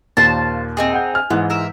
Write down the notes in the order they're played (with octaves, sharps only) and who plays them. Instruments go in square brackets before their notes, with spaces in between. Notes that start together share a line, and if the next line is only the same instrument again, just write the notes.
[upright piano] D#2 A#2 [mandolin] C5 F5 A5
[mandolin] C4 D#4 G#4
[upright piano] F#5 G5 G6
G#5 F6
[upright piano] G#2 E3 G#3 [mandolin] B3
[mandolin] A#4 E5